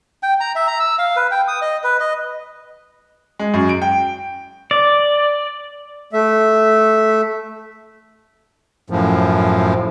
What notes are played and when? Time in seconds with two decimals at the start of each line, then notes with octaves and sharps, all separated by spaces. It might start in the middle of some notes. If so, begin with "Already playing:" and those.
0.23 G5
0.40 A#5
0.55 E5
0.67 A#5
0.80 E6
0.99 F5
1.16 B4
1.31 G5
1.48 D#6
1.62 D#5
1.84 B4
2.00 D#5
3.39 G#3
3.54 F#2
3.69 D7
3.82 G5
4.71 D5
6.13 A3 E5
8.90 F#2 A2 F3